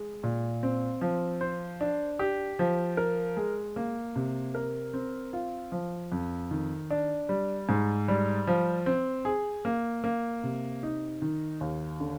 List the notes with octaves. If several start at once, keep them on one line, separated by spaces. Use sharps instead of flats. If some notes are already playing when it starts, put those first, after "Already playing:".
Already playing: G#3
A#2
C4
F3
C5
D4
G4
F3
A#4
G#3
A#3
C3
A#4
C4
F4
F3
F2
D#3
D4
G3
G#2
G3
F3
C4
G#4
A#3
A#3
C3
D#4
D#3
D#2
D3